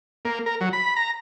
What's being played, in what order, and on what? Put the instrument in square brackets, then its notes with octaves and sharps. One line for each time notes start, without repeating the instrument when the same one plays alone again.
[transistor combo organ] A#3
A#4
F#3
B5
A#5